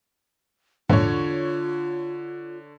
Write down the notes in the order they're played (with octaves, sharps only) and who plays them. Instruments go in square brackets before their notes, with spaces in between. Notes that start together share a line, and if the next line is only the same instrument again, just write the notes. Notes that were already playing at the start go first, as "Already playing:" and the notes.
[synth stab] A#1 E2 G#2 [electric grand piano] D3 C#5 [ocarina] F4